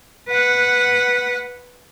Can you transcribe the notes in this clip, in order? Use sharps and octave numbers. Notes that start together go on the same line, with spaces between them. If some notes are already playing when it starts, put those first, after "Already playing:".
B4 F#5